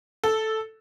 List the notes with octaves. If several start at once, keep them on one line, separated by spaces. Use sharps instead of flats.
A4